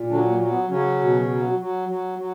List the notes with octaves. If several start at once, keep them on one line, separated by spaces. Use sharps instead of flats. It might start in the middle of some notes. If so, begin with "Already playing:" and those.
Already playing: A#2
D3 F#3 D4
A#3
F#3
B3
C#3 F#3 C#4
B2
F#3
F#3
F#3
F#3